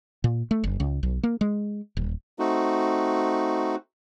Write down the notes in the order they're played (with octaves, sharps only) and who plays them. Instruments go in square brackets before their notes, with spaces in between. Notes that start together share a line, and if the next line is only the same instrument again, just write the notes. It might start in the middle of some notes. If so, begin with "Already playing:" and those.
[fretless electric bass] A#2
A3
F#1
C#2
B1
A#3
G#3
D#1
[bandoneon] A3 C4 D#4 F#4